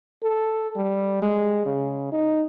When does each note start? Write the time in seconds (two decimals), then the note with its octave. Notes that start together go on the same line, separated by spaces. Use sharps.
0.23 A4
0.76 G3
1.22 G#3
1.65 C#3
2.12 D#4